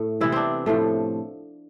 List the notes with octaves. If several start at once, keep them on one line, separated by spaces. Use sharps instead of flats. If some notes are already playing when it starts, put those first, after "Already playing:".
Already playing: A2 A3
C3 E3 B3 E4
C4 D4
A2 F3 A3